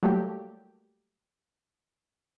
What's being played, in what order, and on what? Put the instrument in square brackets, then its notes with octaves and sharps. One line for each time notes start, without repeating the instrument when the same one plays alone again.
[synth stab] F#3 G3 A3 A#3 G4